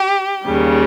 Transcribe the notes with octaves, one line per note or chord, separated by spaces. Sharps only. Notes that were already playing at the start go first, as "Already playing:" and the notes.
Already playing: G4
D#2 C#3 G3